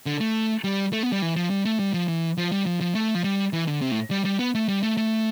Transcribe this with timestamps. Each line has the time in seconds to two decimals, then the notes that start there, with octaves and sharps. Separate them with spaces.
0.06 D3
0.21 A3
0.64 G3
0.93 A3
1.03 B3
1.12 G3
1.22 E3
1.36 F3
1.50 G3
1.65 A3
1.79 G3
1.94 F3
2.08 E3
2.38 F3
2.52 G3
2.66 F3
2.81 F3
2.95 A3
3.15 F3
3.24 G3
3.53 E3
3.67 D3
3.81 C3
3.91 A2
4.11 G3
4.25 G3
4.39 B3
4.55 A3
4.68 G3
4.83 A3
4.97 A3